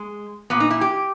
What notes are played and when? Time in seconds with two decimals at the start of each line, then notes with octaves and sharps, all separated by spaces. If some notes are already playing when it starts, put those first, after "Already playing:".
Already playing: G#3
0.50 A#2 B3
0.60 D#4
0.70 E4
0.81 G4